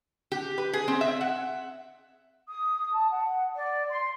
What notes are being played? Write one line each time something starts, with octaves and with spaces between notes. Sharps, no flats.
G4
B4
G#4
C4
E5
F#5
D#6
A5
F#5
D5
C6